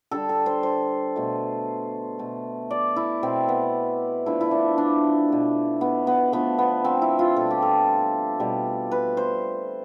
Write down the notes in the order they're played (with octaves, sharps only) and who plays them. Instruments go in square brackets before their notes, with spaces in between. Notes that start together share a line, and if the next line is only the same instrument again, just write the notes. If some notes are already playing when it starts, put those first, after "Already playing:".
[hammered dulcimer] D3 G3 A4
A4
C5
C5
B2 A3
B2 A3
D5
E4
B2 A3 C4
B3
D3 F3 A3 E4
E4
D4
D4
B2 A3
B3
B3
D3 F3 A3 B3
B3
C4
E4
F4
B2 G3 A4
G4
A4
B2 G3
B4
C5